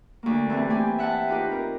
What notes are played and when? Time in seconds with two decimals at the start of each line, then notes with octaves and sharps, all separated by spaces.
0.23 D2 A#3
0.50 E3 A3 C4 G4 B4
0.70 C4 G4 G#5
0.99 E5 F#5 G5 A5
1.28 D#4 F4 G4 B4
1.51 C4 A#4